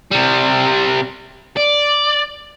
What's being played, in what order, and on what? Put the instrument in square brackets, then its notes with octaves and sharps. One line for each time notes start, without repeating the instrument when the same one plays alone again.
[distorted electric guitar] C3 G3
D5